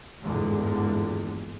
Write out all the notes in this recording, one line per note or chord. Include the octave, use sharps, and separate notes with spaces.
G#1 E2 G2 A#2 D3 G#3